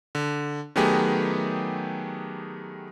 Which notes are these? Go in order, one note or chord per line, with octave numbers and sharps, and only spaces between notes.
D3
D#3 F#3 A3 B3 G4 G#4